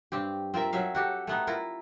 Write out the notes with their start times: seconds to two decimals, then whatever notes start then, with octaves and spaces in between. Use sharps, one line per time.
0.12 G2 C4 G4
0.54 C4 F4 A#4 E5
0.73 F#3 C#4 E5 F5
0.95 F#4 G4 A4
1.27 A3 B3 D#4
1.47 E4 F4 A#4